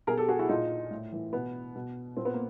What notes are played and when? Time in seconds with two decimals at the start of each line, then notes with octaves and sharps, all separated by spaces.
0.07 B2 G#4 A#4
0.18 G4 A4
0.28 F#4 G#4
0.39 E4 F#4
0.49 A#2 D#4 F4
0.91 A2
1.12 E3
1.33 B2 B3
1.76 B2
2.17 A#2 C4
2.25 B3
2.34 A#3